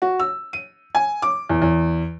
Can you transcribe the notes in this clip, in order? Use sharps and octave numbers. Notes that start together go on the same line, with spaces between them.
F#4
E6
D#7
G#5
D6
E2
E2